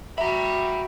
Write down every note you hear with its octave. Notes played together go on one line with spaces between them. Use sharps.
F#4 E5 G5 A#5 B5